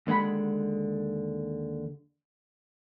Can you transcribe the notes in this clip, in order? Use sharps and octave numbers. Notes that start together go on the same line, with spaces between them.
D#2 D3 G#3 F#5 B5